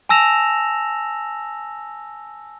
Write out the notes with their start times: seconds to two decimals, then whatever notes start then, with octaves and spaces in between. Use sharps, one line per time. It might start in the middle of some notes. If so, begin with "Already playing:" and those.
0.09 G#5 A5 E6 A#6 E7 F7